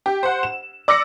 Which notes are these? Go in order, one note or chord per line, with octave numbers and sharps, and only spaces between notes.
G4
C5 F#5
E7
D5 D6 E6 A#6 C#7